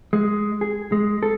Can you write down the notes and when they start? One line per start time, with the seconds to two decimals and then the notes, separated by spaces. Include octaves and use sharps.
0.13 G#3
0.61 G#4
0.92 G#3
1.23 A4